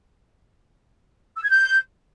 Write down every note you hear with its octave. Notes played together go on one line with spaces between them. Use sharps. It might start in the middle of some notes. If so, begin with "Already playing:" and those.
E6
G#6
G6